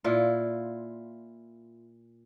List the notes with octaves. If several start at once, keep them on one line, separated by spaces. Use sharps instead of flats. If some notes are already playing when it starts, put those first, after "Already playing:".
A#2 E4 F4